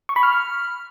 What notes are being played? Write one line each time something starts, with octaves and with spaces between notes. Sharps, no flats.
C#6
B5
F6